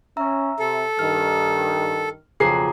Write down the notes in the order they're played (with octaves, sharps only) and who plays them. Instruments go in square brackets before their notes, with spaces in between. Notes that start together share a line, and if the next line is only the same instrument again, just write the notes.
[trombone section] C#4 [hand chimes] E5 A#5 E6
[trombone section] C3 [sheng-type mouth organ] A4
[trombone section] G2 D#3 [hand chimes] F6
[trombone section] B1 F2 [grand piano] C#3 G#4 C7 [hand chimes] F4 A#5 D6